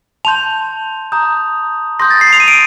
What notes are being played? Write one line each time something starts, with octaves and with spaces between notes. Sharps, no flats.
A5 C6 G6 F7
A#5 D#6 G6
C6 D#6 G6 A#6
A6
C7
F7
D#7
D7